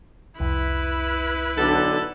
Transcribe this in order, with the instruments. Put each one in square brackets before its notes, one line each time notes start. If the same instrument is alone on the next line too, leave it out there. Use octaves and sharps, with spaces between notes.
[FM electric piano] C2 F2 [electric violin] E4 B4
[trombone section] B1 D3 [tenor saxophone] A4